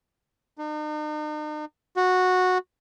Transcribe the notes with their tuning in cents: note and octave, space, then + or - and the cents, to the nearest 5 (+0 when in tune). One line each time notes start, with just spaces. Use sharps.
D#4 -45
F#4 -10